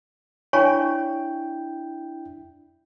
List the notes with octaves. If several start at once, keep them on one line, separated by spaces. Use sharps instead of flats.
D4 E4 C#5 G5 G#5 C#6